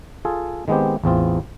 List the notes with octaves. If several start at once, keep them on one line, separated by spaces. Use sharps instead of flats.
F4 G#4 A4
D#3 G#3 B3 C4 G4
A1 E2 C4 F4